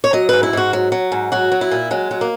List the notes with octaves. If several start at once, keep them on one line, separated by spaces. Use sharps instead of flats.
C#5
F#3 D#5
G#2 B4
E4
G#2 F#4
F#3
F#3
G#2
F#3 F#4
F#3
E4
A#2
F#3 G#3
F#3
A#3